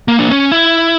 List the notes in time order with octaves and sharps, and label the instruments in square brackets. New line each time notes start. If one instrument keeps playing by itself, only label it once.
[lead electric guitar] A#3
D4
C#4
E4